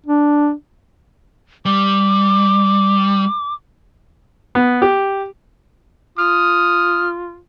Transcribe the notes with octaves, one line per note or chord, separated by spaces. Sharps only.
D4
G3 D6
B3
G4
F4 D#6 F6